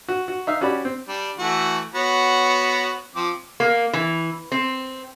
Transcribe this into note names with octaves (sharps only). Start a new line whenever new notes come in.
F#4
F#4
D#4 E5 F5
C#4 F#4 G4 D5 B5
C4
G3 D4
E3 A3 F#4
B3 F#4 C#5
F3 C4 D6
A#3
E3
C4